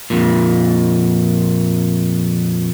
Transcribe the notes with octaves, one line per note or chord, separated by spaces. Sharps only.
F2 A#2